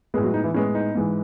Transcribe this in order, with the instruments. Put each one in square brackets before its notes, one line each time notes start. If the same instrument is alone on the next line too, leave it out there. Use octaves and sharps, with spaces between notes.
[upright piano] A2 G#3 B3 G#4
F#3 F#4
D#4
E3 E4
A2 G#3 B3 C#4
D#4
G#2 E3 G#3